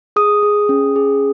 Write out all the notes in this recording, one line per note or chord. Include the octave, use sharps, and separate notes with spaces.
G#4 D#6
G#4
C#4
G#4